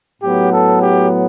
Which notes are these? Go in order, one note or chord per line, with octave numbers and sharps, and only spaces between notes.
A2 F#3 B3 G4
A4
G4